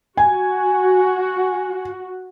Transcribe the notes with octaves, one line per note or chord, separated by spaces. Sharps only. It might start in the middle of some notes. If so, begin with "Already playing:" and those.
F#4 G#5